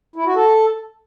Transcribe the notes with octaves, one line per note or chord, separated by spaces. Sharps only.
E4
F#4
A4